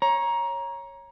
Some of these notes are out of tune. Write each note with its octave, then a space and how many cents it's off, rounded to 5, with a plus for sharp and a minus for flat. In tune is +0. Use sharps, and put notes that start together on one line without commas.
C#5 -10 A#5 +20